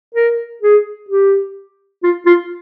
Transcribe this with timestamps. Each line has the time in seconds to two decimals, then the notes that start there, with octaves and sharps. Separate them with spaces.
0.15 A#4
0.62 G#4
1.09 G4
2.03 F4
2.26 F4